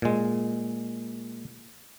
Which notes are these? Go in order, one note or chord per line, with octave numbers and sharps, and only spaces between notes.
A#2 G#3